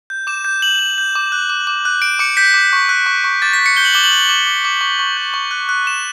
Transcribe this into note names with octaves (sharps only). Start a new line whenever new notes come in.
G6
D6 E7
G6
G6 F#7
G6
G6
D6
F#6
D6
D6
F#6
G6 D7
D6 C#7
G6 B6
D6
C#6
F#6
C#6
C#6
D6 A6
B6
G6
C#7
G6 G7
F#7
D6 G7
F#7
F#6
D6
D6
D6
C#6
C#6
G6
C#6
F#6
F#6
F#6 E7